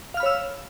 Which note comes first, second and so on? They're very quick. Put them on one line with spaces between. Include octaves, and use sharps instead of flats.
F5 F6 B5 C#5 E6